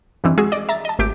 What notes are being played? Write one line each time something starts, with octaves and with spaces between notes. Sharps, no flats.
G2 D#3 E3 C4
G#3 F#4 G#4 E6 G#6
D5 D#5
E5 A#5 A6
D#5 A5
G#1 A3 G4 D7